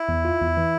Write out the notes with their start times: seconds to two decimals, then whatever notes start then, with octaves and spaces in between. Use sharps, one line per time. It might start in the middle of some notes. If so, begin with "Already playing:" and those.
Already playing: E4
0.09 E2
0.25 F4
0.41 E2
0.57 E3